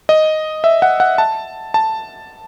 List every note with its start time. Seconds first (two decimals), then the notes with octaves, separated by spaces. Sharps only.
0.09 D#5
0.64 E5
0.82 F#5
1.00 F#5
1.18 A5
1.74 A5